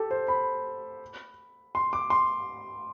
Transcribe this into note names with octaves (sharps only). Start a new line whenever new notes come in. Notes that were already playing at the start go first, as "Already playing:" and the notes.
Already playing: G4 A4
C5
B5
C6
D6
C6